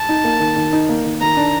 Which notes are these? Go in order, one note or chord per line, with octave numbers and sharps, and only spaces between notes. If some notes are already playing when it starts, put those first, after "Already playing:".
Already playing: A5
D#4
A#3
D#3
D#3
D#4
A#3
D#3
D#3 A#5
D4